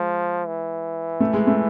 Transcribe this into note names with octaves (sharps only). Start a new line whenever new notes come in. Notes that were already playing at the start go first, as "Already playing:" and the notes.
Already playing: F3 G#3
E3
A3
G#3
A3